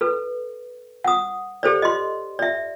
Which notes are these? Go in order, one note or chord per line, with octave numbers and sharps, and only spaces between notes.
A4 B4
F#5 D#6
G4 A4 C5 D5
D#5 C6
D5 E5